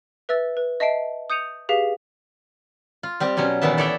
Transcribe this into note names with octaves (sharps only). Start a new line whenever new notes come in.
B4 E5 E6 A6
B4
D#5 E5 A5 C7 D7
D#6 G6 C#7 D#7 F7
G4 G#4 B4 F5 B6 C7
F4
G3 C4 G4
B2 F#3 G3 C#4
A#2 D#3 E3 B3 E5 A5
E4 A4 C#5 D5 E5 G5